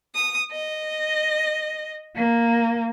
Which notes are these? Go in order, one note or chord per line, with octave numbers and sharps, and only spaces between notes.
D#6
D#5
A#3